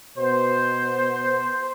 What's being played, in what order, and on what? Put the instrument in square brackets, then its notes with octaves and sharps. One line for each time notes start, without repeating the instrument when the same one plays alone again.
[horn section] B2 B3 C5